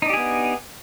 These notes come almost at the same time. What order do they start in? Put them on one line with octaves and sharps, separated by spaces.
D#4 D4 G4 G#4 B3